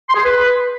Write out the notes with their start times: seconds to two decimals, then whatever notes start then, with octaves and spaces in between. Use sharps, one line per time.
0.09 C6
0.14 G#4
0.19 C6
0.24 B4